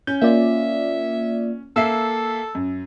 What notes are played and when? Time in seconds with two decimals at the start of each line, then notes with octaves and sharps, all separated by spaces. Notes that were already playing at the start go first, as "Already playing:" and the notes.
0.07 C#4 G6
0.22 A#3 F4 D5 E5
1.76 A#3 A4 E5 E6 C7
2.55 F#2